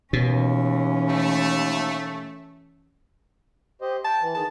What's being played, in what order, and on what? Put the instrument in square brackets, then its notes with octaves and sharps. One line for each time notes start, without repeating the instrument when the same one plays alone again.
[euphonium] D#2 [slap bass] B2 [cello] E3 C#4
[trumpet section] A3
[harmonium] G4 C5 D#5
[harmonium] G5 [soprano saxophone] A5
[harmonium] E3
[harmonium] D#3 G#4 [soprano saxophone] A5